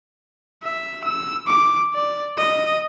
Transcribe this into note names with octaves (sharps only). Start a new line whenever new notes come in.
E5
E6
D6
D5
D#5